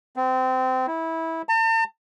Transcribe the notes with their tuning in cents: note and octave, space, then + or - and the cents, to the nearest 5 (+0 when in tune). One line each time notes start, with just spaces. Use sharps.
C4 -25
E4 -20
A5 +45